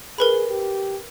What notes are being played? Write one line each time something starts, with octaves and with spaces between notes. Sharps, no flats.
G#4 A#4 B4 B5
G4